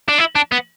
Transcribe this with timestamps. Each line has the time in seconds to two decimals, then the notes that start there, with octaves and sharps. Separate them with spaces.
0.08 D4
0.18 E4
0.35 D4
0.52 B3